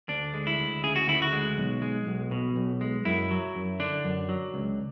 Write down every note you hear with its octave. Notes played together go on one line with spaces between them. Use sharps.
D2 D4
G#3
E4
D2
C#3 G#4
F#4
D2 E4
F#4
G#3
B1
G#3
B1
B2
B1
G#3
F#2 E4
F#3
F#2
D3 D4
F#2
F#3
C#2